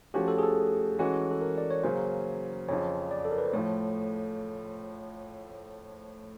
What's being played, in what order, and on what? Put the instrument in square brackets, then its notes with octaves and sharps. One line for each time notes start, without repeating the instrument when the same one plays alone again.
[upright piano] F3 A3 C#4 F#4 [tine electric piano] G4
[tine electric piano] A4
G#4
A4
[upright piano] E3 G#3 C#4 F#4
[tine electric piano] A4
A#4
D5
C#5
[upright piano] C#3 F#3 A#3 C#4 [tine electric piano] C5
[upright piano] F2 C#3 F3 [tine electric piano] C#5
[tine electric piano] D5
A4
A#4
B4
C5
[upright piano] A2 F3 A3 [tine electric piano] C#5